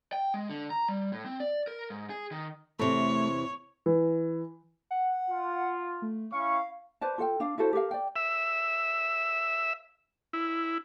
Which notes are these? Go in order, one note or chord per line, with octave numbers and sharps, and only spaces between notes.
G5
G#3
D3
A#5
G3
A2
C4
D5
A#4
G#2
G#4
D#3
E2 C3 A3 C#5
E3
F#5
F4
A3
C#4 E4 F5 C#6
B4 C5 D5 A5
F4 A4 F#5 G5
D4 F5
E4 F#4 A4 C5
G4 A4 A#4 F5
D5 G5
E5
E4